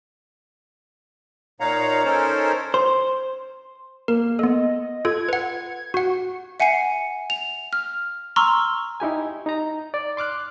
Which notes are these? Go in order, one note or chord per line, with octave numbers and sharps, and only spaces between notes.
A#2 D#4 C#5 F5 F#5 A#5
C#4 D#4 A4 A#4 C5 C#5
C5
A#3 A#4
B3 A4 D#5
F4 A4 G#6
B4 F#5
F#4 F#5
E5 F#5 G#5 C7 C#7
F7
F6
A#5 C6 C#6 E6 F6
D#4 E4 G4 G#5
D#4 A#5
D5
C6 D6 F6 F#6